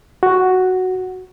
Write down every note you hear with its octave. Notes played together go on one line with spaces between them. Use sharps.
F#4